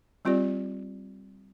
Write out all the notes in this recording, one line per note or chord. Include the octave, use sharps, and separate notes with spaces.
G3 C4 F4 G4 D5